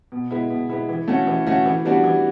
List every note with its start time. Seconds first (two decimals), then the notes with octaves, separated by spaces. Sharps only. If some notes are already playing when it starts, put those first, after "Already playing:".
0.12 B2
0.31 G#3 B3 E4
0.50 B2
0.70 G#3 B3 E4
0.89 E3
1.08 A3 C#4 F#4
1.27 E3
1.47 A3 C#4 F#4
1.66 E3
1.85 G3 B3 D4 F#4
2.04 E3